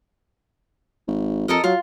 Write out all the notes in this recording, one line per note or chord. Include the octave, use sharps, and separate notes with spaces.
G#1
F2 A4 A#4 D#5
F#3 F4